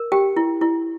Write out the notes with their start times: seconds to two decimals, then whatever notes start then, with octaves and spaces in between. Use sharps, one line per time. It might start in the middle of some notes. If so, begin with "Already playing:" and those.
Already playing: A#4
0.12 G4 G5
0.36 E4
0.61 E4